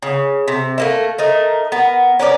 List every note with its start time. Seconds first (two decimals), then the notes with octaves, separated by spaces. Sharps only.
0.02 C#3
0.48 C3
0.78 A3 A#3 E4
1.18 A3 D#4 A#4
1.72 B3 A#4
2.19 C#4 A#4 B4 D5